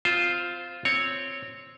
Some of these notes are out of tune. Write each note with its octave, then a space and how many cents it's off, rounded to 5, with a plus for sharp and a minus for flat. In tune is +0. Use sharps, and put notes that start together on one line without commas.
C4 -25 F4 +0 C5 +0
C4 +0 C#5 +0